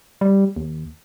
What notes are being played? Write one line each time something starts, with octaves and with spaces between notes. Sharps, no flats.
G3
D#2